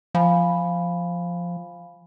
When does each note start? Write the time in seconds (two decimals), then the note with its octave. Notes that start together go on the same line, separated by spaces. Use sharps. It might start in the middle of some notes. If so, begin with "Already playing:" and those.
0.14 F3 F5 G#5 B5